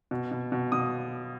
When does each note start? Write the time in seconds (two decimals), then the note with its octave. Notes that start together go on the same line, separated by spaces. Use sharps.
0.11 B2
0.31 B2
0.52 B2
0.72 B2 D#6